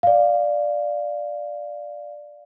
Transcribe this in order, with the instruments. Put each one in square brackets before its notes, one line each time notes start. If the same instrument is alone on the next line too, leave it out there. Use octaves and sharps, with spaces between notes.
[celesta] D5 F5